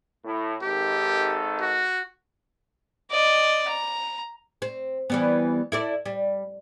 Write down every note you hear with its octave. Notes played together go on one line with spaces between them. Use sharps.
A2
G#1 D#3 G4 A4
F#4
D5 D#5
A#5
C4
E3 G3 B3
E4 A4 D5
G3